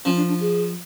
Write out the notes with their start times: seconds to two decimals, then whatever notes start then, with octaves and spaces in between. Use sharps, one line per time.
0.05 F3 C#4
0.17 D4
0.29 D4
0.41 G#4